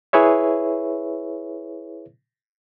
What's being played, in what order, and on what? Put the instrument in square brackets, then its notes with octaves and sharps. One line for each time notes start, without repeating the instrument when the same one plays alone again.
[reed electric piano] E4 G#4 B4 C#5 E5